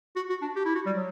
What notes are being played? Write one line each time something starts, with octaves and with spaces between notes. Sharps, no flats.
F#4
F#4
D4
G4
E4
F#4
G3
F#3